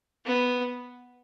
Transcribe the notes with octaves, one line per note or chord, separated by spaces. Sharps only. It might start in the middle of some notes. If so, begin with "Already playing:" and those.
B3